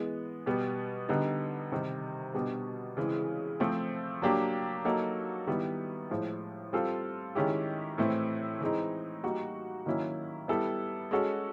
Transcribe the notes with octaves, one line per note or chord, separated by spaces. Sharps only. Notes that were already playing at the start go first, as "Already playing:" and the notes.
Already playing: E3 G#3 B3
B2 G3 B3
D3 G3 B3 D#4
C3 D#3 G3
B2 G3 B3 D4 F#4
C#3 E3 G#3 C4
F3 A3 C4
F#3 A#3 D4 G4
F#3 A#3 D#4 F#4 A4
D#3 G3 B3 E4
A2 F3 G#3
G3 C4 F4 A4
D#3 G#3 C#4 E4 G4
A2 E3 A3 C4 E4
E3 G#3 C4 D#4
G3 A#3 D#4 F#4
D#3 F#3 A#3 C#4 E4
G3 B3 E4 A4
G#3 C#4 F#4 A4